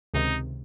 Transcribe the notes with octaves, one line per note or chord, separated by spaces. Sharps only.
C#2 C3 D#3 D#4